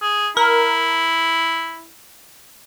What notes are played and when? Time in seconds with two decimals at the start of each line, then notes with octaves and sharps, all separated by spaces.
0.02 G#4
0.37 E4 A#4